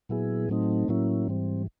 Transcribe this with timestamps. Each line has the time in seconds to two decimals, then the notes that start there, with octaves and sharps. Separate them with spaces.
0.09 A#2 F#3 B3 E4 G#4
0.49 A2 F#3 A3 C4 D#4
0.88 A2 F#3 A#3 C#4 E4
1.28 G#2 E3 G3 C4